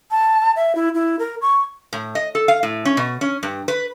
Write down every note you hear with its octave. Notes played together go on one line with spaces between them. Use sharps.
A5
E5
E4
E4
A#4
C#6
A2
D#5
A4
F5
A2
C#4
B2
C#4
G2
B4